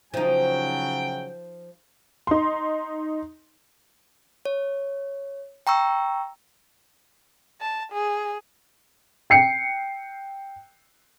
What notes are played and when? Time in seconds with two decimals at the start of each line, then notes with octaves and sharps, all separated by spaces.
0.14 C#3 F3 F#3 D#4 G5
2.27 D#4 C6
4.45 C#5
5.67 G5 A#5 C#6 E6
7.61 A5
7.92 G#4
9.30 G5 C7 C#7